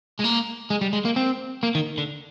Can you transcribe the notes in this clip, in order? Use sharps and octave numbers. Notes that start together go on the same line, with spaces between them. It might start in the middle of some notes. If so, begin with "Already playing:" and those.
G#3
A#3
G#3
G3
G#3
A#3
C4
A#3
D#3
D3